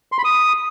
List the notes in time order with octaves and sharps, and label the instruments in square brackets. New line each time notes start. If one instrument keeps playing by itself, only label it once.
[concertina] C6
B5
D#6